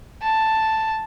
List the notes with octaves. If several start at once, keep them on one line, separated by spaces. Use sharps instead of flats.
A5